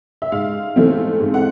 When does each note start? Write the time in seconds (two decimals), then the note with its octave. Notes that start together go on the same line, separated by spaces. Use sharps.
0.22 E5
0.32 G#2 F5
0.76 E3 A3 C4
1.20 G#2
1.34 F#5